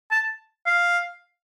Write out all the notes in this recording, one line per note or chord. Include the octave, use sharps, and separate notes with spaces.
A5
F5